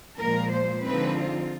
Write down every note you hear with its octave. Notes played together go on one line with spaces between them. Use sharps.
A#2 F3 G#3 A#4
C5
D3 F3 G#3 C4 D#4 B4
F4